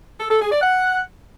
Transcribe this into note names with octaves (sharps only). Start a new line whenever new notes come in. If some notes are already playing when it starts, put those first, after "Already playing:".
A4
A4
G#4
D5
F#5